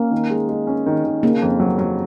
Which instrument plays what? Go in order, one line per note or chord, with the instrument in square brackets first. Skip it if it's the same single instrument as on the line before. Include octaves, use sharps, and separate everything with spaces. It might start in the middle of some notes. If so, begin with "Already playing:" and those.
Already playing: [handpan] A#3 [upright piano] C#4
[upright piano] D#3
G#3
G#3
C#4
D#3
D#3
[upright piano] C#3 [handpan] A#3
[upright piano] F2
F#3
F#3